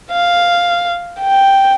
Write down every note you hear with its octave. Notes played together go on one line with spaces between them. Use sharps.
F5
G5